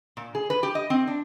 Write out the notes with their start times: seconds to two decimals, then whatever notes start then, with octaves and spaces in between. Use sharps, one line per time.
0.17 A#2
0.35 G#4
0.50 B4
0.63 G4
0.75 D#5
0.90 C4
1.08 D4